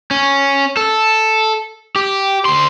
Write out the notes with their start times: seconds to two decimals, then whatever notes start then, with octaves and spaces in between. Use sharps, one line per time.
0.11 C#4
0.77 A4
1.96 G4
2.45 D2 C6